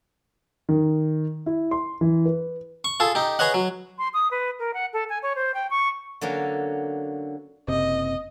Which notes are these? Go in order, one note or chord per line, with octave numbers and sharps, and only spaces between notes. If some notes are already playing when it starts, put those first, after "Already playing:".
D#3
E4
C6
E3
B4
C#6
F4 G#4 A4
D#4 G4
G#4 B4 C#5 D#5 F#5
F#3
C6
D#6
B4
A#4
F#5
A4
G#5
C#5
C5
G5
C#6
D3 F#3 A#3 C#4
F#1 C3 D#5